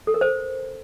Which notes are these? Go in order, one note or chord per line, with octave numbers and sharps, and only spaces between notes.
A4
A#4
C5